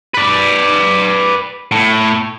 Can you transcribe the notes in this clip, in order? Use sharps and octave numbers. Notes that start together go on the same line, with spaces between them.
B4 D5
A2